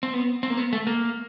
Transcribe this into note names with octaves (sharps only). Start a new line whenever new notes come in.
C4
B3
C4
A#3
B3
A3
A#3